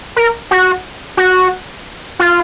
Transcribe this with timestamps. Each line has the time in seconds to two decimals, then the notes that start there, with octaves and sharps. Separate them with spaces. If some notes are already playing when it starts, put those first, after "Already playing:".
0.16 A#4
0.51 F#4
1.17 F#4
2.19 F4